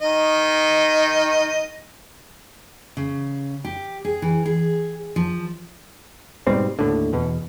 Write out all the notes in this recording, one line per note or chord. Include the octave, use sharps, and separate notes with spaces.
D#3 D#5
C#3
G4
G#4
E3
G#4
F3
G#2 B2 G3 C4
D#2 A2 D3
E2 B2